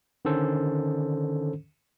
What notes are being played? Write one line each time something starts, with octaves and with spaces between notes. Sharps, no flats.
D3 D#3 C#4 A4 C5